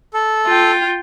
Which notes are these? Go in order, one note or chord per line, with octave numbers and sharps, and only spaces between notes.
A4
F4 G5